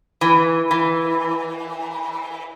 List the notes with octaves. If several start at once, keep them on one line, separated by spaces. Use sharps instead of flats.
E3
E3